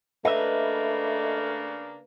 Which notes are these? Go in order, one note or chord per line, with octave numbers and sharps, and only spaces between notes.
C#3 A3 A#3 D4 B4 D#5 E5